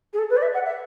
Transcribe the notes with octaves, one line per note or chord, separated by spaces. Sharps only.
G#4
A4
B4
D5
E5
F#5
E5